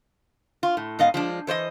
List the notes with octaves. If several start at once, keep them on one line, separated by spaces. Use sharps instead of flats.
F4
A2
G#2 B3 D#5 F5
F3 G#3 D4
E3 C5 D5 D#5